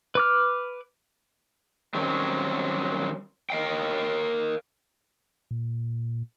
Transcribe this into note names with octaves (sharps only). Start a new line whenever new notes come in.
B4 D6 F6
D#3 F#3 G3 C4 C#4
A#4 D#5 F5 G5
A#2